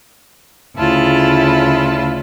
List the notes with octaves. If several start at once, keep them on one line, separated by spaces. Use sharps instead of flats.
D2 C#3 E4 F4 A5 B5